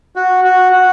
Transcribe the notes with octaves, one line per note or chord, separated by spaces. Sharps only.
F#4
F#4
F#4